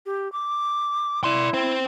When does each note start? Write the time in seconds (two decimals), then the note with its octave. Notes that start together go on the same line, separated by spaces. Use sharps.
0.06 G4
0.32 D6
1.24 E4 D5 C6
1.54 C5 G5